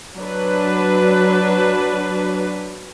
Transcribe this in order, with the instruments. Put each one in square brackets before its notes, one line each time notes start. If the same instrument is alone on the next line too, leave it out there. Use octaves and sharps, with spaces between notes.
[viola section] F#3 D4 B4